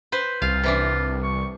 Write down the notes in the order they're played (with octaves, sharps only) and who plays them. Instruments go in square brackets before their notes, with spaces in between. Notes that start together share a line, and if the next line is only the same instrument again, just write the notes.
[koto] B4 C5
[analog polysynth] C2 [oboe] F4 [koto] F5
[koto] C3 E3 D4
[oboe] C#6